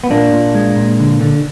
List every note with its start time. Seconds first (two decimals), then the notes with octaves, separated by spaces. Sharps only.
0.04 B3
0.10 A#2 A#3 D4
0.33 A#2
0.55 G#3
0.76 A#2
0.99 D3
1.21 D3